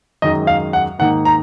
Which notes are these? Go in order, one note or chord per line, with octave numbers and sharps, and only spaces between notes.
F#2 D#3 G#3 D#4 D#5
F5
F#5
G#2 D#3 A#3 D#4 F#5
A#5